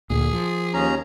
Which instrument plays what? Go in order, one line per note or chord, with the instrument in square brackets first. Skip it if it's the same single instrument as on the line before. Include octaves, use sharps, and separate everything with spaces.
[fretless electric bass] D2 A#2 [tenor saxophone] G#4
[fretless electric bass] F3
[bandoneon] D#2 C#4 A#5